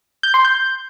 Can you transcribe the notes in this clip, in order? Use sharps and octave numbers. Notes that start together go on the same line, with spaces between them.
G6
C6
G6